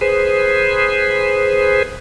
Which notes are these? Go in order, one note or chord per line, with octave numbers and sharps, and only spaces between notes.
G#4 B4 C5